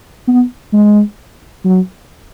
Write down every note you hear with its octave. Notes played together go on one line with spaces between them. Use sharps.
B3
G#3
F#3